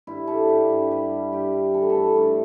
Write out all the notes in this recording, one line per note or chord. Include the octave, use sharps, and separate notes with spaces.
G2 E4
G3 A4
G2 G4
G2
G3 B4
G3
G2 G4
G3
E3 A4
B4
A4
A3
G2